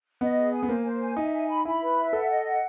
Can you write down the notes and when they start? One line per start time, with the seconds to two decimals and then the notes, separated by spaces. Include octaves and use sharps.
0.21 B3 D#5
0.38 G#4
0.53 G#5
0.63 B3
0.69 A#3 C5
0.84 C5
1.01 G#5
1.17 D#4 E5
1.33 G#5
1.49 B5
1.65 E4 B5
1.82 B4
1.97 E5
2.13 A4 F#5
2.29 D#5
2.45 F#5